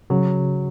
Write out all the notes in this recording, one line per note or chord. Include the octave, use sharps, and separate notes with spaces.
C#3 F#3